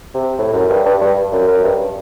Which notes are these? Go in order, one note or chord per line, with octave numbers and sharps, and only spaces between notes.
C3
A2
F#2
G2
G2
G2
F#2
F#2
G2